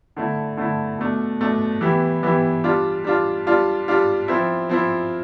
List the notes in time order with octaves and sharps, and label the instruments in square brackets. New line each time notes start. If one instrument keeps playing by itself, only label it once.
[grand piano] D3 A3 E4
D3 A3 E4
B2 A3 D4
B2 A3 D4
E3 B3 E4 G4
E3 B3 E4 G4
G3 D4 F4
G3 D4 F4
G3 D4 F4
G3 D4 F4
F3 C4 E4
F3 C4 E4